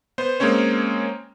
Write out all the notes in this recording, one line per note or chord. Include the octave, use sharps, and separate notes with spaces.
B3 C5
G#3 A#3 C4 C#4 C#5